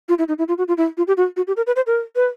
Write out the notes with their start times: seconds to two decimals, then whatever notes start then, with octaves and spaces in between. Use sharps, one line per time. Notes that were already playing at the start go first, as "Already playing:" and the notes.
0.09 F4
0.18 E4
0.28 D#4
0.38 E4
0.48 F4
0.58 F#4
0.68 F4
0.77 E4
0.97 F4
1.07 G4
1.17 F#4
1.37 F#4
1.47 G4
1.57 A#4
1.67 B4
1.76 C5
1.87 A#4
2.16 B4